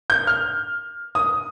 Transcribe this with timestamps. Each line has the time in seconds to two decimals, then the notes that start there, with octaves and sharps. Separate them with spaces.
0.10 G6
0.27 F6
1.15 D#6